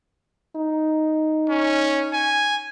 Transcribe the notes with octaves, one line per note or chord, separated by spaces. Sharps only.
D#4
C#4
G#5